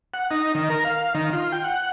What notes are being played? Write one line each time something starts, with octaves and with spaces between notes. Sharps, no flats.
F#5
D#4
D#3
A#4
F5
D#3
F4
G5
F#5